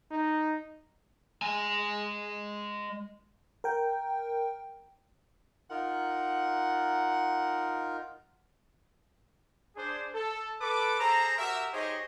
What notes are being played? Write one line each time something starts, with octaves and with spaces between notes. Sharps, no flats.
D#4
G#3 G#5
A#4 G5
D#4 F4 A#4 F#5
D4 G#4 C5
A4
A4 B4 D6
G#4 A4 C5 A#5
F#4 G4 A#4 E5
D#4 G4 G#4 C5 C#5 D#5